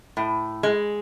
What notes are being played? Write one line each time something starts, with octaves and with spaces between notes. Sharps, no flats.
A2
G#3